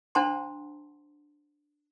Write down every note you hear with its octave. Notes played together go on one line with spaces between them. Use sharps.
D4 C5 F#5 A5 A#5 C6